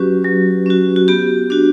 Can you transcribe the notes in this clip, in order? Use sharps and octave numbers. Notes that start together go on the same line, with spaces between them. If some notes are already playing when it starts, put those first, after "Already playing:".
Already playing: F#3 C#4 F#4 G4 B4
F#3
C#4 F#4
F#4
B3 G4
D4 F#4